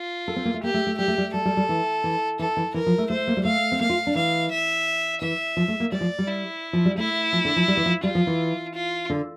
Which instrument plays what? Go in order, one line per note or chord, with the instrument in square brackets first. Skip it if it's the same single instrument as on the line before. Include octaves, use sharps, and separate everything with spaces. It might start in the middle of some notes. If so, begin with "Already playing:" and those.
Already playing: [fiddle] F4
[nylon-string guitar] A4
C4
A#3
A3
[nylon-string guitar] A#3 [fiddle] G4
[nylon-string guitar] A3
A3
[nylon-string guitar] G3 [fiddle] G4
[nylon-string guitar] A3
G3
[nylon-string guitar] G3 [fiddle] A4
[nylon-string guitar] G3
G3
E3
E3
[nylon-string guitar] E3 [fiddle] A4
[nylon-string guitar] E3
[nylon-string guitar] E3 [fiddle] A#4
[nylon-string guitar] F3
A3
[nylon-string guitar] A3 [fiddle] C5
[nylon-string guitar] A#3
G3
[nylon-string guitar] A3 [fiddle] F5
[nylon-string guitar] C4
[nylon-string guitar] A#3 [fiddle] F5
[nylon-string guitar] F4
D4
[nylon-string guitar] E3 [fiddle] F5
[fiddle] E5
[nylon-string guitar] E3 [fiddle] E5
[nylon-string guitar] F3
A3
A#3
[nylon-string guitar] G3 [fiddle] D5
[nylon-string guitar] F3
G3
[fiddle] E4
[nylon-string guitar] F3
G3
[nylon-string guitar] A3 [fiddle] E4
[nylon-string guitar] F3
D3
F3
G3
E3
F3
[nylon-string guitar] G3 [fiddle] F4
[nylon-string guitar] F3
E3
[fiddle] F4
[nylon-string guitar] D3